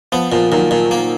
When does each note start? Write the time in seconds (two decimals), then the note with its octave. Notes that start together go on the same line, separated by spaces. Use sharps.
0.12 F3 B3
0.32 A#2 F3
0.52 A#2 D#3 F#3
0.71 A#2
0.91 A#3